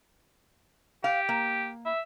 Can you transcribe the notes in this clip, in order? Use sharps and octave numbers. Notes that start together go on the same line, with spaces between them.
G4 F5
A#3
E5